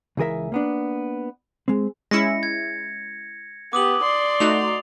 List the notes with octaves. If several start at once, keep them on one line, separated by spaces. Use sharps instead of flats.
C#2 E3 G#4 A#4 E5
A#3 B3 D4
G#3 C4
G#3 C#4 E4 A#6 C#7
G#6
B3 G4 D6 D#6 F#7
D5 C6
A3 D#4 F#4 F7